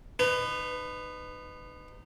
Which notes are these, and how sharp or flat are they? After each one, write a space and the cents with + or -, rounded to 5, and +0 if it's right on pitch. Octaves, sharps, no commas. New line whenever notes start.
D#4 -25 B4 +20